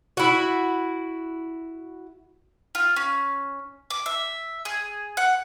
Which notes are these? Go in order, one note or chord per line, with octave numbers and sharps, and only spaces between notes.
E4 F#4
F4
C#4
D6
E5
G#4
F#5